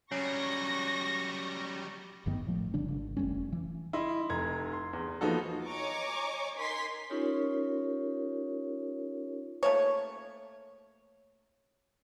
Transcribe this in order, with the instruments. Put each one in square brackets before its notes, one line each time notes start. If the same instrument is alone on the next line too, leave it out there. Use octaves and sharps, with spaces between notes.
[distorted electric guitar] F#3 G3 [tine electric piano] C#4 [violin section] C#6 A#6
[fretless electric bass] G#1 G2 D#3 B3
A2 F3 A3
G1 C#3 G3 D4
G#1
F1 G3 A3 C#4
E3
[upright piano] E4 D#5 C6
F1 A#5 G#6
C6
E2
F3 A#3 B3 D#4 F#4 A4
[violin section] C#5 D#5 G#5 A#5 C#6 D6
D#4 A#4 G#5 C6 B6
[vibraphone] C#4 D#4 F4 G4 A#4 C#5
[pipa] A3 A#3 C#5